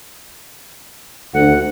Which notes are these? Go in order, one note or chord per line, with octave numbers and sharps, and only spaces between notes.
D2 F#5